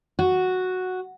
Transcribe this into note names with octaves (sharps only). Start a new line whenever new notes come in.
F#4